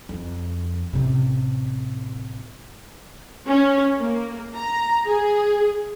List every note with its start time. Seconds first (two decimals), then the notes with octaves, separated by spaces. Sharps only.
0.09 F2
0.93 A1 C3
3.47 C#4
3.99 A#3
4.55 A#5
5.06 G#4